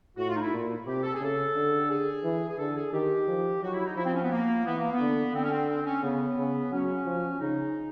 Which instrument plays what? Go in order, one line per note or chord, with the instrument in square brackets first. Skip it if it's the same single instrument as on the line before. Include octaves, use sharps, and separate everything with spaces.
[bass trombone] A2 [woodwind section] F#4
[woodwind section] F4
D#4
E4
[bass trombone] A#2
[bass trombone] C3 [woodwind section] G4
[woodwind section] A4
G#4
[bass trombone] C#3 [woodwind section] A4
[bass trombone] D3
[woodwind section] G4
G#4
[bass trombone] E3
[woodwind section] G#4
[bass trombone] D3 [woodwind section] A4
[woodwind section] G#4
[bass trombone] D#3 [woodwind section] G4
[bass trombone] F3
[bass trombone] F#3 [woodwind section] F#4
[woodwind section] E4
D#4
[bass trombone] F3 [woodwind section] E4
[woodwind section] C4
C#4
B3
A#3
[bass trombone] E3 [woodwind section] B3
[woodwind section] A#3
B3
[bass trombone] D3
[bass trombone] D3 [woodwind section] C4
[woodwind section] C#4
C4
C4
C#4
[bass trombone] C#3 [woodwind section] B3
[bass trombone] C#3
[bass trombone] F#3 [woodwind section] C#4
[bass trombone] F3
[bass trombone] C#3 [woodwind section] D#4